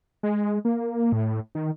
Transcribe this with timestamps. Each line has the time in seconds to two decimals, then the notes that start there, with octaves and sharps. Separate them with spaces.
0.23 G#3
0.65 A#3
1.12 A2
1.55 D#3